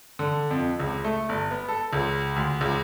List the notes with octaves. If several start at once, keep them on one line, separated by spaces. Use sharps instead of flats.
D3
F2
C#2
A3
G1
B3
A4
C#2
D2
C#2